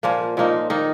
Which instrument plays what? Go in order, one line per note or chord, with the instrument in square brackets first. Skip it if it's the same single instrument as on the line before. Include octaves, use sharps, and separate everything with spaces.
[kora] A#2 F3 A#3
A#2 F3 A#3 D#4
D#3 A#3 D#4